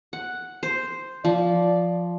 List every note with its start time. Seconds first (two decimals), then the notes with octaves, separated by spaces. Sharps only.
0.13 F#5
0.63 C5
1.25 F3 D5